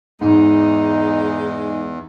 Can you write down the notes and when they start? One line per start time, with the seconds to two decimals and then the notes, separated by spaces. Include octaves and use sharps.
0.21 E2 G#2 G#3 D#4